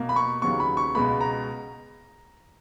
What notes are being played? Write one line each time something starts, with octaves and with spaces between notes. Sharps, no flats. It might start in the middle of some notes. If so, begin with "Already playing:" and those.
Already playing: B2 A#3
B5
C#6
D#2 C#3 F#3 B3 C#6
B5
C#6
C#2 B2 G#3 B3 B5
A#5